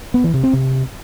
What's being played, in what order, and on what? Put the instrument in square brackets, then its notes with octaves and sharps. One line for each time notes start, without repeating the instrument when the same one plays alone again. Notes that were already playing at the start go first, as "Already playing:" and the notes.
[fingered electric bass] B3
E3
C3
C4
C3